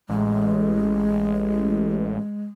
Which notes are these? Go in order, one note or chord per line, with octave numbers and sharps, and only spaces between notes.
A1 G#3